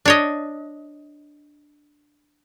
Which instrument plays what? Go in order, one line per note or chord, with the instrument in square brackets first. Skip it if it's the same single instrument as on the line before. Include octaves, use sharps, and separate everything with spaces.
[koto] D4 C#5 D#5